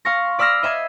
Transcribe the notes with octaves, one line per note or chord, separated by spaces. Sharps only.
F5 C6 C#6 A#6
D5 B5 E6 F6 A#6 C7
D#5 E5 B5 G#6 C7